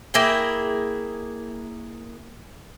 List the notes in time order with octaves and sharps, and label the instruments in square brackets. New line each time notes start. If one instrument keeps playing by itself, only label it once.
[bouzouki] A#3 E4 G#4 G5